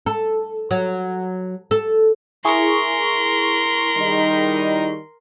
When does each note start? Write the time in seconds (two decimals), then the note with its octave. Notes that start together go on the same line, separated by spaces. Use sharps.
0.06 A4
0.71 F#3
1.71 A4
2.45 E4 G#4 A#4 C6 C#6
3.96 D#3 G3 D#4